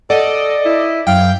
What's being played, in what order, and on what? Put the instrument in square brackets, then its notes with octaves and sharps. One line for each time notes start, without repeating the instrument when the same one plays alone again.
[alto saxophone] A4 [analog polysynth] D5 D#5 [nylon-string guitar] F#5
[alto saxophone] E4
[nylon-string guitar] F#2 [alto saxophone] F5 [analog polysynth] G5